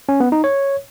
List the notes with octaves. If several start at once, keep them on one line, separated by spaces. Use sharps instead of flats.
C#4
B3
D#4
C#5